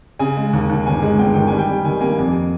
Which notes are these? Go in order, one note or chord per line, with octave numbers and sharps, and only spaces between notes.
C#3 G#5
G#3
D#2
D#2
G1 G#5
G#3
G1 G5
D#3 G5
G3 G#5
G5
G3
D#3 G#5
A#3 G#5
F2